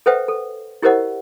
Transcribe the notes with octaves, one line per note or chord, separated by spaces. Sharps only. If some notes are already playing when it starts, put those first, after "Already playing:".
A4 B4 C5 E5 F#5 G5
A4
E4 G4 A#4 C5 D#5 F#5